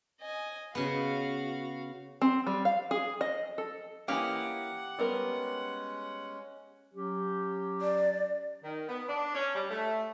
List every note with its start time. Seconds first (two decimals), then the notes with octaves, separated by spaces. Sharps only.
0.21 D#5 G#5
0.75 C#3 B3 F#4 F5
2.22 C4
2.47 G3
2.65 F5
2.91 G#4
3.21 D#5
3.58 A4
4.08 E3 A#3 C#4 G4 D#5 F5 F#5
4.99 G3 G#3 B3 C#4 A#4
6.94 F#3 C#4 G4
7.81 D5
8.63 D#3
8.88 B3
9.08 D4
9.35 C#4
9.55 G3
9.70 A3